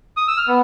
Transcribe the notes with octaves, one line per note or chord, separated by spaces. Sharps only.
D#6
E6
F6
B3